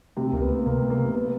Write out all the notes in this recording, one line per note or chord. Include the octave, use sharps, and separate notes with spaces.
C3 A3 C4
C#2 A#3
B3
A3
C3 A#3
A3
A#3
A3
B3